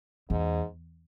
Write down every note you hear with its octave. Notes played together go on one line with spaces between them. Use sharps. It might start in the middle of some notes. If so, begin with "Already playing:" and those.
E2 G#2